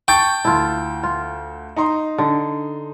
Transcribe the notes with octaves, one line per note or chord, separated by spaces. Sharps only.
G5 A5 C#6 A6
D2 E4 F4 A5
F4
D#4 A#5 C6
D3